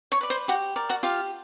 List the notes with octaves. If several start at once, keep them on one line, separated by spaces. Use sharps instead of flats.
C#5 C#6
B4 D5
C5 C6
F#4 G4 F#5
A#4 D5
F#4 F#5
F4 G4 F5